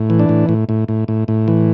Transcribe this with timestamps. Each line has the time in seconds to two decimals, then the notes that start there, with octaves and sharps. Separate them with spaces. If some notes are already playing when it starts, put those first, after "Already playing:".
Already playing: A2
0.10 E3
0.19 D4
0.29 A2
0.49 A2
0.69 A2
0.88 A2
1.08 A2
1.28 A2
1.48 E3